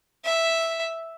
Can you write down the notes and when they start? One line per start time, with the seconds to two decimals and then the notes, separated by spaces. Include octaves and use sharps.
0.25 E5